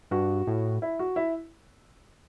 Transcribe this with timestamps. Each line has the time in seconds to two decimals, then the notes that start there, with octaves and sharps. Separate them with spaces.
0.11 G2 F#4
0.47 A2
0.82 E4
0.99 F#4
1.16 E4